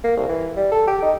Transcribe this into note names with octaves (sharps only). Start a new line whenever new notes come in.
A#3
C2
E3
G3
A4
G4
D#4